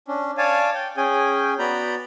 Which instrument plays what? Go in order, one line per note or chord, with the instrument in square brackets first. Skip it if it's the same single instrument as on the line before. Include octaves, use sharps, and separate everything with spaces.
[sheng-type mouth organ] C#4 D4
C#5 D5 F5 G#5 A5
G5
C#4 G#4 G5 G#5
B3 F#4 D5 A#5 B5 G6